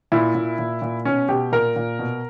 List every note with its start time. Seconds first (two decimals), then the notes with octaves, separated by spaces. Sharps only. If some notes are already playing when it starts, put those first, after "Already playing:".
0.12 A#2 E4
0.35 A#2
0.59 A#2
0.82 A#2
1.05 B2 C#4
1.29 B2 G4
1.52 A#2 A#4
1.76 A#2
1.99 B2